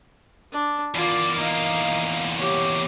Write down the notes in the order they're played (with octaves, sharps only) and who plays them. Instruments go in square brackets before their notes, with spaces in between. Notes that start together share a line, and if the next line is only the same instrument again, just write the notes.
[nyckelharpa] D4
[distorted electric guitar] E2 A#3 [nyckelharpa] F4 D5
[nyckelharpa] D#4 F5
G4 C#5